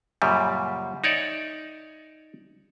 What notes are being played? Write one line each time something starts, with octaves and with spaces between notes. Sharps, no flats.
F#2 A#2 C#3 G3
D#4 C#5 D5 E5